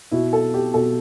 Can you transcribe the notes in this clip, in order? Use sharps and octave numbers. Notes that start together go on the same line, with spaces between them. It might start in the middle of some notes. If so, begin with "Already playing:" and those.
B2 E4
A4
G4
B2 A4